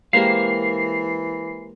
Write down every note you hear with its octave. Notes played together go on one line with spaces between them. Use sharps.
E3 G#3 A#3 G4 A#4 C5 F5 C7